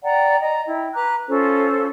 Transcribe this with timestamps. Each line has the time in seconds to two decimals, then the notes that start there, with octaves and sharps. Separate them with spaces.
0.03 D5 F#5 G5 A#5
0.40 D#5 A#5
0.66 E4 G5
0.94 B4 A#5 D6 F#6
1.28 C#4 F4 A4 C5